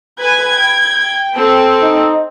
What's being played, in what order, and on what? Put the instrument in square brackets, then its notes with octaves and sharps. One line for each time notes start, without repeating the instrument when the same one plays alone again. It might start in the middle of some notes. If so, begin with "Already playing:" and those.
[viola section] B4 G#5 [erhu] G#6
[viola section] G5
[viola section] C4 [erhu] A4
[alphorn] D#4